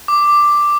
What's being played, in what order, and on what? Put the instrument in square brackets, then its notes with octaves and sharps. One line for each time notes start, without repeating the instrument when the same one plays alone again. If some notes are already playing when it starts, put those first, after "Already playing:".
[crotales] D6